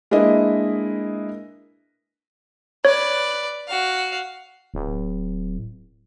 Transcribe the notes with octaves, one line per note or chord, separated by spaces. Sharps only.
G#3 A#3 D4 E4 B4 D#5
B4 C#5 D5
F#4 F5
D1